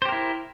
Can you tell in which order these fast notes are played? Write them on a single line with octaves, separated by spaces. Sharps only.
C5 G4 A#4 E4